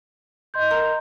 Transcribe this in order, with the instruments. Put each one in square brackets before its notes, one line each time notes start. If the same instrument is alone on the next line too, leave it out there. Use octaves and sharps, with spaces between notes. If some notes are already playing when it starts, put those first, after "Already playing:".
[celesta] D#5 C6 G6
[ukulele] A#4